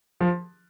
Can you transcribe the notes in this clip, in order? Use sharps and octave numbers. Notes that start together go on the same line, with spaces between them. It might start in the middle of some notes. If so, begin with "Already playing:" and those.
F3